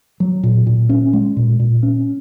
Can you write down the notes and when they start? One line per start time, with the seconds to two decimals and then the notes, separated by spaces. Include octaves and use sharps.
0.20 F#3
0.43 A#2
0.66 A#2
0.89 C#4
1.13 G#3
1.37 A#2
1.60 A#2
1.83 C#4